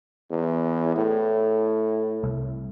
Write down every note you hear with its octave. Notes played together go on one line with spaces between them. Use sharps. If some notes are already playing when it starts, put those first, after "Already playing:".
E2
A2
C2